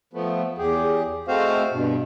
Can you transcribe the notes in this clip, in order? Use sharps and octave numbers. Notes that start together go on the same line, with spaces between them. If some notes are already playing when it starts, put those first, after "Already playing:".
F3 A3 B3
E2 G4 G#4
G#3 A3 C4 F#4 C5 F5
G2 B2